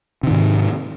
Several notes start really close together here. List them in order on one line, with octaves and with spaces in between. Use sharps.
C3 D#3 G#2